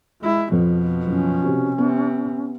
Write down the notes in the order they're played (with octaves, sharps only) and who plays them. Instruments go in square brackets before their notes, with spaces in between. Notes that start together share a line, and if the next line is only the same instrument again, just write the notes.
[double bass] G#3 E4
[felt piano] F2 [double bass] B2 F3
[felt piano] F#1 [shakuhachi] C#4
[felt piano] C3 F#4
[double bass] C3 [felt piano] B3